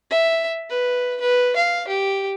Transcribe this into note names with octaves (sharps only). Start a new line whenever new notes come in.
E5
B4
B4
F5
G4